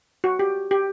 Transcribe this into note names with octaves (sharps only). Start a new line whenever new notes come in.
F#4
G4
G4